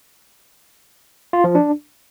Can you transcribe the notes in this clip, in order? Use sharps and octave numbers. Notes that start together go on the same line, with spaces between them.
F4
F3
D4